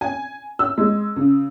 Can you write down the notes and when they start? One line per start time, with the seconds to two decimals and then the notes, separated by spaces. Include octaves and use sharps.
0.01 G#5
0.59 E6
0.78 G#3
1.16 C#3